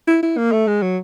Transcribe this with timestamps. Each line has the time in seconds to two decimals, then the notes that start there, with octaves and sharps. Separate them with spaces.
0.07 E4
0.23 E4
0.37 A#3
0.52 A3
0.67 G#3
0.82 F#3